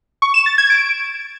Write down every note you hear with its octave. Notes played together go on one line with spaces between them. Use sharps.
C#6
E7
A6
G#6
D7